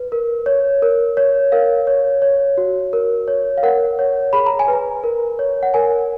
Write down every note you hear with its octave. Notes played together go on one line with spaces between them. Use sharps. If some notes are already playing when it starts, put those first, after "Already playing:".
Already playing: B4
A#4
C#5
A#4
C#5
A#4 F5
C#5
C#5
F#4
A#4
C#5
F5
A#4 F#5
C#5
G#4 B5
A#5
G#5
B4
A#5
A#4
C#5
F#5
A#4 G#5